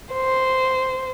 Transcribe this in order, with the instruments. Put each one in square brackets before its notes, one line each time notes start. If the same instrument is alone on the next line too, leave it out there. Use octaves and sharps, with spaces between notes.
[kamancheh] C5